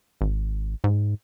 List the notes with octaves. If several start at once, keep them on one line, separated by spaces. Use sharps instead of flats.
G#1
G#2